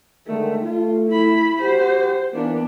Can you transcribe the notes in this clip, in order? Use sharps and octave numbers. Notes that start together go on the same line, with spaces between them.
D3 D#3 G#3 A3
A3 F4
E4 B5
F#4 G4 C5
E3 A#3 B3 D4